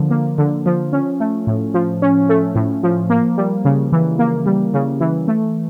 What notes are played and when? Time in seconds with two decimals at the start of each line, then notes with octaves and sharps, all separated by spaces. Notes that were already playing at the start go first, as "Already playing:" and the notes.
Already playing: D3 F3 A#3
0.11 A#3
0.38 D3
0.66 F3
0.93 C#4
1.20 A3
1.47 A2
1.74 F3
2.02 C#4
2.29 A3
2.55 A2
2.83 F3
3.10 A#3
3.37 G3
3.65 C#3
3.92 E3
4.19 A#3
4.46 G3
4.74 C#3
5.01 E3
5.28 A3